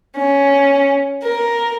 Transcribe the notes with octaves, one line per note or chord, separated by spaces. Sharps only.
C#4
A#4